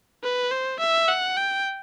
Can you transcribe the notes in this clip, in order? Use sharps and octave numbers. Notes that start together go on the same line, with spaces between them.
B4
C5
E5
F#5
G5